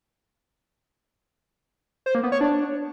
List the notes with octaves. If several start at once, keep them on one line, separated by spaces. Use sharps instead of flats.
C5
A#3
B3
C#5
D4